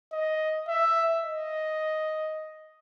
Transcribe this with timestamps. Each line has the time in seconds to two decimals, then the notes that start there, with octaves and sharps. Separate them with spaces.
0.12 D#5
0.68 E5
1.23 D#5